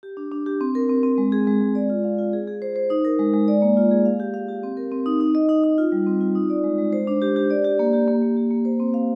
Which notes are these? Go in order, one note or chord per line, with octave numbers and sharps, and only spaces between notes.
G4
D4
D4
G4
C4
A#4
C4
C4
G#3
G#4
G#3
G#3
D5
F4
F5
F4
G#4
G#4
C5
C5
D#4
A#4
G#3
G#3
D5
A#3
F4
G#4
F5
G4
F5
G4
C4
A#4
C4
D#4
D#4
D#5
D#4
D#4
F4
G3
C4
F4
D#4
D5
G#3
G#3
C5
D4
G4
G4
D5
G4
A#3
G4
A#3
A#3
G4
A#3
C5
C4
F5